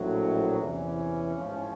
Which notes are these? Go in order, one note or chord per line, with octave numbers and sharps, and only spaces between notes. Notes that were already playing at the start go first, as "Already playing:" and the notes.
Already playing: A#1 A2 F#3
E2 C3 E3 C#4
A1 G#2 F3